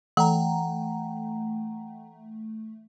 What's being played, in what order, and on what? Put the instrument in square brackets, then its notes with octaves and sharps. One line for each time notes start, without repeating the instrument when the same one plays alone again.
[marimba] E3 [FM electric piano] A3 [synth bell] F#5 G5 A#5